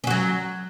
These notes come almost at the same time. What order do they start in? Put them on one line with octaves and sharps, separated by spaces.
C#4 F#4 F#3